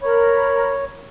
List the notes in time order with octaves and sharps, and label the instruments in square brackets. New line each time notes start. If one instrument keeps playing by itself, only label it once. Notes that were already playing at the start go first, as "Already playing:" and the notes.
[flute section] A#4 B5 [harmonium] C#5